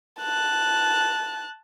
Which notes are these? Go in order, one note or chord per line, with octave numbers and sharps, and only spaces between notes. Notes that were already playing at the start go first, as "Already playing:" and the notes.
A5 F#6